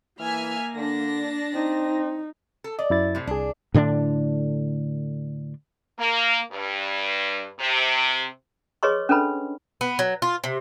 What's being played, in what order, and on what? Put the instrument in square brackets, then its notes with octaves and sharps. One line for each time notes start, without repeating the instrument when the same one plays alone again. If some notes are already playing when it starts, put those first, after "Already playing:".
[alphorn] E3 [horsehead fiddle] A#3 [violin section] E5 G#5 F6
[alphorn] D3 [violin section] D4 A#6
[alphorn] C4 [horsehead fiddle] D#4
[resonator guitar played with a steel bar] A4
[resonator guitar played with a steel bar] D5 [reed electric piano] D#5
[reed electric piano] F#2 E4 A6
[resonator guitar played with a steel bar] A2 C3
[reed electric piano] C2 G#4 [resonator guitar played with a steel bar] D4
[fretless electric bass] A2 D3 C4 D4
[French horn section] A#3
G2
C3
[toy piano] G#4 B4 C#5 D#5 C6 C#6
C#4 D4 A4 B4 B5
[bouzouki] B3
F#3
F4
C3